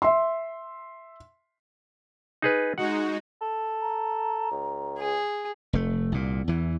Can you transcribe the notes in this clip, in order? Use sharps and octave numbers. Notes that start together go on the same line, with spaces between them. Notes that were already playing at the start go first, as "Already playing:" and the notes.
E5 C6
D#4 G#4 B4
G#3 D#4 F#4 F#5
A4
A#5
C#2
G#4
F1 A3
C2 A#2
E2 E3